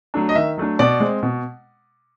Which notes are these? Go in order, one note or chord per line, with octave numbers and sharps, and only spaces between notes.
F#3 A3 D4
D#5
D#3 E5
F#3 A3 D4
B2 D5
G#3 C4
B2